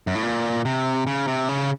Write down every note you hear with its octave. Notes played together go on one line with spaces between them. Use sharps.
F#2
A2
A#2
C3
C#3
C3
C#3